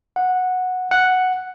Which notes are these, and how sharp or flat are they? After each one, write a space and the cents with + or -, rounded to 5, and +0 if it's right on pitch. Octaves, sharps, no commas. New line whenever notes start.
F#5 -10
F#5 +0